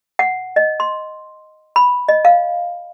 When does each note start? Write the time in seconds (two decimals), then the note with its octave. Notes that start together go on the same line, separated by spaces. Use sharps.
0.19 F#5
0.56 D#5
0.80 C6
1.76 B5
2.08 D#5
2.25 F5